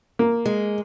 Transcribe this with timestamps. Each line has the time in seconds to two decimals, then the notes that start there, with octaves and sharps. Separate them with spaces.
0.19 A#3
0.46 G#3